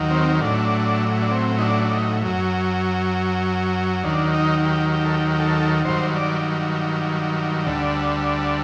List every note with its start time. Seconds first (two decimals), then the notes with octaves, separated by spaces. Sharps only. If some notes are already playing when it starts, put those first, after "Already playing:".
Already playing: D#2 D#3 F#3
0.10 C4
0.41 A2 F#3 D4
1.22 D4
1.31 C4
1.58 D#4
1.61 D4
1.85 D4
1.91 D#4
2.22 F#2 F#3
4.03 D#2 D#3 F#3 D4
4.34 D#4
4.64 G4
4.94 G4
5.05 A4
5.14 G4
5.31 G4
5.39 A4
5.85 G2 D#3 F#3 C5
6.16 D5
7.66 D2 D3 G3